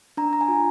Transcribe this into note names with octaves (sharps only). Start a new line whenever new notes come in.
D4 A#5
A#5
G#5
F4